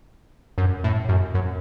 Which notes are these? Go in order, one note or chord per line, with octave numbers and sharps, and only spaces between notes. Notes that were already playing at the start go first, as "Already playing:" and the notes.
F#2
A2
F#2
F#2